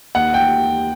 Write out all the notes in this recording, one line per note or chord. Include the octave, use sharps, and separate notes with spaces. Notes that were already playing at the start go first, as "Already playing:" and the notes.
D#2 F#5
G5